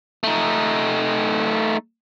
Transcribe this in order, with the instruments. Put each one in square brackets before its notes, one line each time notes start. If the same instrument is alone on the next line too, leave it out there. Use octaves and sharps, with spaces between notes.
[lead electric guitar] A3 D#4